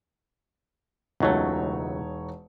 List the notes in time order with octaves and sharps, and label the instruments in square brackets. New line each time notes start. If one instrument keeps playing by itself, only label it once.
[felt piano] E1 D#4 C#5 [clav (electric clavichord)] C#2 F#3 A3